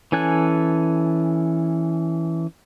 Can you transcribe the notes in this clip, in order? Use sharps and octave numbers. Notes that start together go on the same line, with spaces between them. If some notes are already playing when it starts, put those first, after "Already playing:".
E3 C#4 A4 G#5 F#6